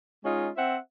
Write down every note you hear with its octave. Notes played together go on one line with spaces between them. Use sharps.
G#3 C#4 D#4 F4
C4 C5 E5 F#5